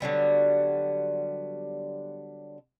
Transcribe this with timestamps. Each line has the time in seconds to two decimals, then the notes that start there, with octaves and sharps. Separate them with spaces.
0.01 D3 F#3 G3 B3